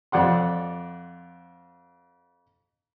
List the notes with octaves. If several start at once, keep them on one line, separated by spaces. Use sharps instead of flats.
F2 D5 F#5 C6